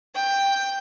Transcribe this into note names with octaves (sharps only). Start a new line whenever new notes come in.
G5